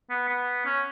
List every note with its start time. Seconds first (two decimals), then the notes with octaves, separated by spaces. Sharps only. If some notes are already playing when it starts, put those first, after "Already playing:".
0.10 B3
0.29 B3
0.66 C#4